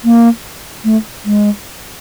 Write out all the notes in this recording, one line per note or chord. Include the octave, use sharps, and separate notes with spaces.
A#3
A3
G#3